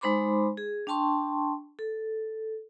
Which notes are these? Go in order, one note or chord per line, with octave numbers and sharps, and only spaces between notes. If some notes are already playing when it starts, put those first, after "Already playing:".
G#3 D#4 C5 B5 C6 D6
G#4
D4 G5 A5 C6 C#6
A4